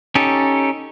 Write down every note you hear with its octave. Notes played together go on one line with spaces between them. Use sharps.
C#4 D#4 G4 A4